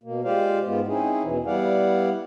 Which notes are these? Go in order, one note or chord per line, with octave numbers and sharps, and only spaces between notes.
B2 A#3
G#3 F4 G4 C5 D5 F5
G#2 G#3 B3 F4
C4 C#4 D#4 E4 G#4
E2 B2 E3
G3 B3 E4 D5 F5 F#5